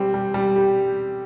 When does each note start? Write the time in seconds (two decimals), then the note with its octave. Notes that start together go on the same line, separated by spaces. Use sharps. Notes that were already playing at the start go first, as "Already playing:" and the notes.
Already playing: G3 C4
0.14 G3
0.34 G3
0.56 G4